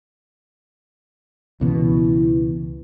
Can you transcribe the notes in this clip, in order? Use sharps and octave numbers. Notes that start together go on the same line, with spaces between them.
C#2 B2 E3